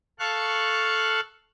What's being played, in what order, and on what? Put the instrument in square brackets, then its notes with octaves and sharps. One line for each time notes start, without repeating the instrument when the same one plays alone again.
[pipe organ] A4 F5 C#6 F#6